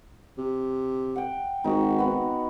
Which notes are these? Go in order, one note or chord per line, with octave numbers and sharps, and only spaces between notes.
C3
F#5 G5
G#1 D#4 F#4
B3 F#5